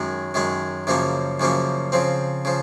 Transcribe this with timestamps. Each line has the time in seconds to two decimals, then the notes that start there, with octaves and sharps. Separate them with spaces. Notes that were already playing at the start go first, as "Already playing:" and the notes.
Already playing: F#2 D#3 G#3 C#4
0.34 F#2 D#3 G#3 C#4
0.87 F#2 C#3 F3 A#3 C#4
1.40 F#2 C#3 F3 A#3 C#4
1.92 C#3 F3 C4
2.45 C#3 F3